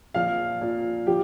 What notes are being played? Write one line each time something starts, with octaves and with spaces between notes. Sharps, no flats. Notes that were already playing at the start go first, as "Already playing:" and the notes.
A#2 F3 F5
A#2 F3
F3 G4